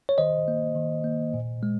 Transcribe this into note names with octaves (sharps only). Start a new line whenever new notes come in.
C#5
D#3 C5 D#5
A#3
D#3
A#3
A#2
G#3